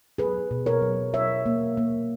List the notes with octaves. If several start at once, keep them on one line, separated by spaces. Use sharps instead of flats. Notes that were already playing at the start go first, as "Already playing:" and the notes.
F#3 G#4 B4
B2
A#4 C#5
F#3
F#3 C#5 E5
A#3
A#3